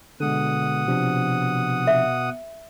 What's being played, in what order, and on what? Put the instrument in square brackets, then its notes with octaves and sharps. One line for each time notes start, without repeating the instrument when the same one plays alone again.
[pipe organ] B2 F#5 D#6 [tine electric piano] D3 G#3
[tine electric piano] C3 F3 D4
[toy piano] E5